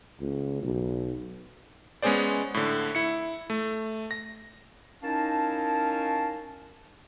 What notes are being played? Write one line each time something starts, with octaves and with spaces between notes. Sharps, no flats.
C#2
B1
G#3 B3 C#4 G#4 C5 D5
A2 D3
E4 C#7
A3
A#6
C#4 D#4 E4 A#4 F5 A5